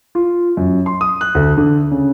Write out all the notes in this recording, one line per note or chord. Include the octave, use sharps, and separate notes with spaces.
F4
F#2
C6
D#6
F#6
D2
D3
C#3